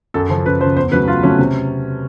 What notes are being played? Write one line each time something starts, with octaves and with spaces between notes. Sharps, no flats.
F#2 A4
C#3 F3
F#2 B4
C#3 F3 C5
E2 C5
C#3 F#3 A3 B4
E2 F4
C#3 F#3 A3 C#4
C3